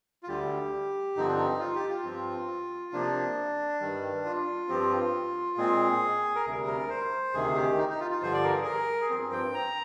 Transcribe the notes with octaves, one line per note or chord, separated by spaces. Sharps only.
F4
D2 D3 G3 G4
G2 D3 F3 C4 D#4
D4
D#4
F4
G4
F4
G2 F3 C4
C3 F3 A#3 D4
G2 D#3 G3
F4
G2 F3 C4 G4
F4
A#2 G#3 C4 G#4
A#4
D2 C3 G3 G#4
A#4
C5
D2 C3 D#3 G#4
G4
D#4
D#4
F4
F4
G2 D3 F3 C5
D5
A#4
G#4
A#4
G#4
G2 F3 C4 A#4
G5
A#5